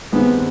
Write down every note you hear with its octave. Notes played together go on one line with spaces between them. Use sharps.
G2 D#3 G#3 B3 C4